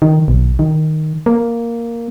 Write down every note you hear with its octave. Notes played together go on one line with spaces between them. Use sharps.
D#3
B1
D#3
A#3